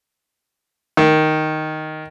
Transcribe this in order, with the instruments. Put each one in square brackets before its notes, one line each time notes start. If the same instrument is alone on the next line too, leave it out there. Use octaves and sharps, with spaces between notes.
[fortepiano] D#3